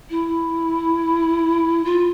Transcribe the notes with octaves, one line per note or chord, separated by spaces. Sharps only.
E4
F4